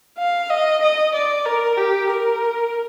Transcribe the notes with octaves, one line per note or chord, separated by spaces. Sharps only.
F5
D#5
D#5
D5
A#4
G4
A#4